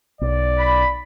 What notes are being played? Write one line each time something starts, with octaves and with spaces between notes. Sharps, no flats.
B1 D5
B5